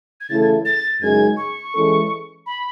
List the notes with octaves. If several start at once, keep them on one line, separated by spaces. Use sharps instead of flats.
G#6
C#3 E3 A3 E4 A4 A6
G#6
A6
F#2 C#3 G#3 D#4 G#4 G#6
C#6
E3 G#3 C#4 E4 A4
B5